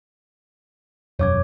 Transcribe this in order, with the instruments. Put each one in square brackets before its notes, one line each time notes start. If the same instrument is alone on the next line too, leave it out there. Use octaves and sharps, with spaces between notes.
[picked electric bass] E1 F#2 [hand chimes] C#5 D6 G#6